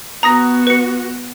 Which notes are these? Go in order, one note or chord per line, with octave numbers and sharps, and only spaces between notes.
B3 F#4 A#5 D#6 A#6
B4 C#7